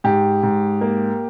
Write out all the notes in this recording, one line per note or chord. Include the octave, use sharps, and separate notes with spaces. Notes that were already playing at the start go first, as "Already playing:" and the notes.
G#2 G4
G#2
A#3